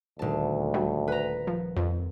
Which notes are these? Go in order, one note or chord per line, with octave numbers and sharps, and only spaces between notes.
D#1 D2 A5
D3 F#3 G3
B4 A#5
F3
F2